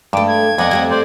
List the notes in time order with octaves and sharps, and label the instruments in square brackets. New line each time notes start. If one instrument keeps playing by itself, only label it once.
[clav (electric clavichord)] G2 [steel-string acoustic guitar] G#3 A3 [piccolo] D6
[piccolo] G#6
[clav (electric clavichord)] F2 [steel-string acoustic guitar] B3 G#4 [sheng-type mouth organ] D5 D#5 F#5
[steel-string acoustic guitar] G3 A3 C4
[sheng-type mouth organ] C5 D5